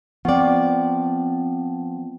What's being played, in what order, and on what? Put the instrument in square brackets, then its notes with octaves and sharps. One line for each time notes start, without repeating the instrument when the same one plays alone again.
[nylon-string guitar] F3 D5 [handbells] B3 C4